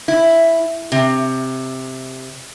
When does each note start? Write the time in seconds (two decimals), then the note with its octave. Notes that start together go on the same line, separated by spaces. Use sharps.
0.08 E4
0.92 C3